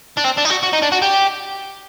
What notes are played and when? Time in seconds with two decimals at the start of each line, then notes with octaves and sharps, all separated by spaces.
0.17 D4
0.24 C4
0.37 D4
0.45 D#4
0.50 F#4
0.63 F#4
0.73 D#4
0.82 D4
0.92 F#4
1.02 G4